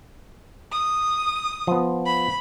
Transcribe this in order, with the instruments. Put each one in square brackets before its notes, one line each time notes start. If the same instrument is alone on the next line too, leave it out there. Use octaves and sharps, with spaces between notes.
[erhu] D#6
[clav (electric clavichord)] F3 B3
[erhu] B5